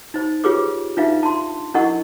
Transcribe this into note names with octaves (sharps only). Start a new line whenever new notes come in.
D#4 C5
F4 G4 G#4 B4 C#5 D6
D4 D#4 F4 B4 E5 F5
A5 C6
D4 E4 A#4 D#5 F#5 C#6